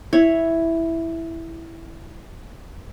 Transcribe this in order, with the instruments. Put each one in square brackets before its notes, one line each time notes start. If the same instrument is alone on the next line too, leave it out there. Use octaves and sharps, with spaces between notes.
[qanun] E4 C#5